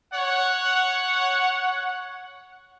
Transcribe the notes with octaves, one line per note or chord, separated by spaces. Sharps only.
C#5 F#5